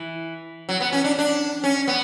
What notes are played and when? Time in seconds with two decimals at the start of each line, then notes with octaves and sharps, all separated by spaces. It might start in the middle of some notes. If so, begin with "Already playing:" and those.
Already playing: E3
0.69 F#3
0.80 B3
0.92 C#4
1.04 D4
1.19 D4
1.64 C#4
1.88 B3